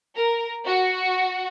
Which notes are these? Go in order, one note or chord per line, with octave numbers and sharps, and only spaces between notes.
A#4
F#4